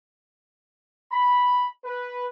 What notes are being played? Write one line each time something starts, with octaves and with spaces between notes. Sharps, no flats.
B5
B4